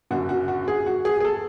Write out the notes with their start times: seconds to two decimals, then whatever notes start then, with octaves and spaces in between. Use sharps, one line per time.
0.11 F#1 F#2 D3 F#4
0.29 F#4
0.48 F#4
0.68 G#4
0.86 F#4
1.05 G#4
1.20 G#4
1.25 A4